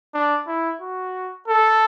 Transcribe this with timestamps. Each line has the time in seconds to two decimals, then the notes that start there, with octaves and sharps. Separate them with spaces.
0.14 D4
0.47 E4
0.81 F#4
1.48 A4